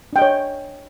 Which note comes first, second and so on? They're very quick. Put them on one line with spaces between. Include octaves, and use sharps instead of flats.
D4 G5 D#5 C#5